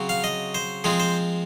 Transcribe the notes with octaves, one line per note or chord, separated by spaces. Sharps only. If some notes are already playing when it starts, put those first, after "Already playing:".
Already playing: C#3 F#3 C4
F5
D#5
C5
F3 G#3 C4 G#4
C5